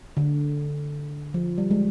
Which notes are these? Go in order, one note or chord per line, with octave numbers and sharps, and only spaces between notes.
D3
F3
G3
G#3